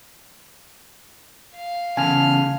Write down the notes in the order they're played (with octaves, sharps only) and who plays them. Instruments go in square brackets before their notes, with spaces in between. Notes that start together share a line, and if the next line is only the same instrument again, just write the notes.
[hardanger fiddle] F5
[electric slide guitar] E2 C#3 A5 [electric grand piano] G#5 [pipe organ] F6